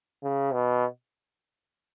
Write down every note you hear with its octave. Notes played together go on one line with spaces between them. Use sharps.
C#3
B2